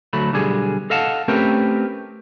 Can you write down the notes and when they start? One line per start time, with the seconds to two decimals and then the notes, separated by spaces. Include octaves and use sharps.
0.13 D2 F#3 A3 B5
0.33 B1 D3 G3 G#4
0.90 A4 D#5 F5 F#5 A5
1.28 A3 C4 C#4 G4 A#4 B4